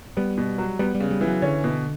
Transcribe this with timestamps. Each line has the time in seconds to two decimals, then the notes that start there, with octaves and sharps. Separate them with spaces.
0.17 G3 B3
0.38 B2
0.58 F#3
0.79 G3 B3
0.95 G3
1.00 C#3
1.11 G3
1.21 E3
1.27 F#3
1.42 D3 C#4
1.64 B2